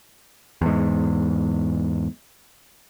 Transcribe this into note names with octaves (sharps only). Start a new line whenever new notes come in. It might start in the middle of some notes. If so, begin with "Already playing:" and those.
E2 G#2